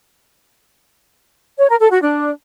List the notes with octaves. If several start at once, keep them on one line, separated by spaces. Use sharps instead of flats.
C#5
A#4
A4
F#4
D4